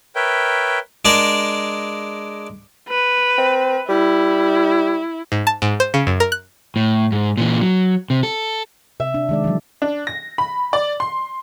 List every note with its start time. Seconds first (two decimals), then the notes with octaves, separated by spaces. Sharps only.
0.15 A#4 B4 C#5 E5 G5
1.05 G#3 D4 G#4 A#4
2.88 B4
3.38 C4
3.89 G3 E4
5.32 G#2
5.47 A5
5.62 G#2
5.80 C5
5.94 C#3
6.07 F#2
6.20 A#4
6.32 F#6
6.76 A2
7.12 G#2
7.37 A#2 E3
7.61 F#3
8.10 C3
8.23 A4
9.00 C3 E5
9.14 D4
9.29 D#3 G#3 D5
9.44 E3 F#3
9.82 D4
10.07 A#6
10.38 B5
10.73 D5
11.00 C6